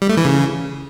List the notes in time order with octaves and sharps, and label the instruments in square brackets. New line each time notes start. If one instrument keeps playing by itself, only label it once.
[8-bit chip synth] G3
A3
E3
C#3